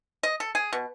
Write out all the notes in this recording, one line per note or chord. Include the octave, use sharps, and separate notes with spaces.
D#5
A4
G#4
B2